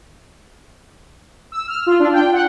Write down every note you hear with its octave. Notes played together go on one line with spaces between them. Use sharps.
E6
F6
F4
D4
G5
F#5